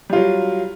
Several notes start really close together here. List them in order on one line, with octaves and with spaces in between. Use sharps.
G3 F4 F#3